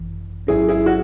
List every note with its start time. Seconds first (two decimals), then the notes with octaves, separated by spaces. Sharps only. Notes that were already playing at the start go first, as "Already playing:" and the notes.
Already playing: G#1 F#2 E3
0.47 A1 G#2 F#3 C#4 E4 G#4
0.69 E4 G#4
0.86 F#4